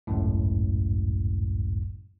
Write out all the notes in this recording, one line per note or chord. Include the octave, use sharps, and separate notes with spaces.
G#1 C#2 F#2 A2